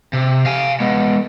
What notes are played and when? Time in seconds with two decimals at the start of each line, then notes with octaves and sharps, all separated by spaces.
0.13 C3
0.46 F5 G#5
0.80 G#3 B3